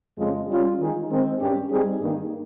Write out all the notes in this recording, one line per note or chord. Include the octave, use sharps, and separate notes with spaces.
F2 C#3 F3 G#3
G3 C#4 F4
D#3 G#3 D#4 G#4
D#3 G#3 C4
G2 G3 C#4 G4
G3 C4 D#4 G#4
G2 D#3 A#3 D#4